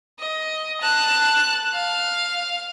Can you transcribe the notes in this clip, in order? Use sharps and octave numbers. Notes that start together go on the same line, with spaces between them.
D#5
A5 F#6
F5